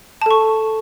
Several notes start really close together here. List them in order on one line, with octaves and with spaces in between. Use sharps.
A5 A4 C#6